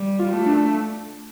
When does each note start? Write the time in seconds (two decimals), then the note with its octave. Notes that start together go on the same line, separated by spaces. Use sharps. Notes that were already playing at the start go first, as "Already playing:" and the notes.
Already playing: G3
0.19 F4
0.33 A3
0.46 D4